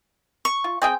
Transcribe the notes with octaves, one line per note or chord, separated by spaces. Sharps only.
C#6
F4
C4 G#4 G5